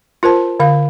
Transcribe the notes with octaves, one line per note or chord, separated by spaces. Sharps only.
F4 A#4 C5 A5
D3 F5